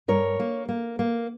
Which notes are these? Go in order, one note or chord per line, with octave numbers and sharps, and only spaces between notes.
G2 A#4 C#5
A#3
A#3
A#3